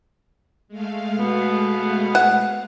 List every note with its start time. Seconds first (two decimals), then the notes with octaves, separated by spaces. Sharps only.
0.68 G#3 A3 F5
1.18 B2 B3
2.15 F#5